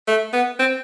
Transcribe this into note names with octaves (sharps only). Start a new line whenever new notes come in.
A3
B3
C4